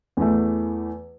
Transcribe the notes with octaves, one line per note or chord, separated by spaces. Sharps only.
E2 E3 A3